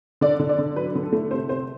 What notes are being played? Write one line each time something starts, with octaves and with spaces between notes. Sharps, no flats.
D3 D5
D3
D5
D3
F#3 B4
D3
A4
A3
C3 C5
C3 C5